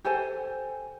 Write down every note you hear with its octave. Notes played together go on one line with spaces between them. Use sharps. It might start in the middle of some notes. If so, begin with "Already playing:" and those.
G4 A4 C5 G#5